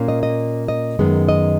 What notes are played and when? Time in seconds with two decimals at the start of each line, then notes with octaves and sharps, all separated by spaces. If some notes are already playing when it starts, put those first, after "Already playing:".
Already playing: A#2 A#3 C#4
0.08 D#5
0.23 D#5
0.68 D#5
0.99 F#2 D#3 G#3 B3
1.29 D#5